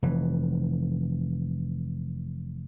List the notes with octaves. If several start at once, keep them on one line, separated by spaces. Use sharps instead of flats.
F1 E3